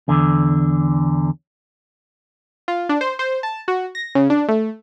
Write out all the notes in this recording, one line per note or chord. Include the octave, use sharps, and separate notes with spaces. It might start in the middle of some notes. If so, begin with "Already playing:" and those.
E2 D3
F4
D4
C5
C5
A5
F#4
A#6
C#3
D4
A3